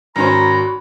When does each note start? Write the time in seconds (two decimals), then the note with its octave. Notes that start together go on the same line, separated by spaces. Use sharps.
0.16 G#1 C#4 F#4 C5 A#5 B5